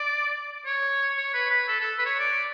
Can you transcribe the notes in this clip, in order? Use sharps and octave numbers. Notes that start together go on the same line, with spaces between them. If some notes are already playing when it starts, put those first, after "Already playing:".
Already playing: D5
C#5
C#5
B4
B4
A4
A4
B4
C#5
D5